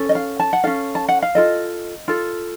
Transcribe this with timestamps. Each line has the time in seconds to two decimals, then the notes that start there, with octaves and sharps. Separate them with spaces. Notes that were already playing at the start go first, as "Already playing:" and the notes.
Already playing: C#4 A4
0.09 D#5
0.15 F5
0.40 A5
0.53 F#5
0.64 C#4 A4 F5
0.95 A5
1.09 F#5
1.22 F5
1.35 F4 A4 D#5
2.08 F4 A4